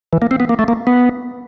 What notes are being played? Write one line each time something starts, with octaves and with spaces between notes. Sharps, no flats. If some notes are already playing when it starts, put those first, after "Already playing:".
E3
A#3
C4
B3
A#3
A3
A#3
B3